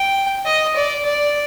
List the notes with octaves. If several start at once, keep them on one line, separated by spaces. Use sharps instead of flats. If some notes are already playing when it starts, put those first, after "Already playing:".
Already playing: G5
D#5
D5
D5